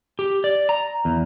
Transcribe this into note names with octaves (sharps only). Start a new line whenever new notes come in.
G4
D5
A#5
E2